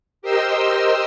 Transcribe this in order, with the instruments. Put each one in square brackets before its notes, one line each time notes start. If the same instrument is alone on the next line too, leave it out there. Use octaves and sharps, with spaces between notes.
[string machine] G4 A#4 C5 D#5 C6 E6